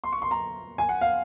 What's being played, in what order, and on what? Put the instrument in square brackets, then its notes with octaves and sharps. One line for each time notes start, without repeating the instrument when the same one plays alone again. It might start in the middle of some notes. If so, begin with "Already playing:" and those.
[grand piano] C6
C#6
C6
A#5
G#5
F#5
F5